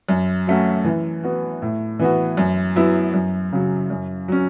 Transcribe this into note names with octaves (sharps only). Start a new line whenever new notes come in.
F#2
F#3 A3 C#4 F#4
E3
B3 F#4
A2
E3 B3 F#4
F#2
F#3 B3 E4
F#2
C#3 F#3
F#2
F#3 C#4